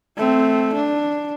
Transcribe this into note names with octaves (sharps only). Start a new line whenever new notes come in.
A3 C4
D4